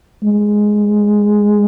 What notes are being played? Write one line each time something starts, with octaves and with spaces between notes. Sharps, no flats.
G#3